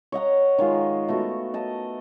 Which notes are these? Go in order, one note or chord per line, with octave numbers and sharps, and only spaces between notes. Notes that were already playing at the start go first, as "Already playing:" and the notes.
C#5 D#5 F#5 A#5
D#3 G#3 F4
A3 B3 F#4
D#5 A5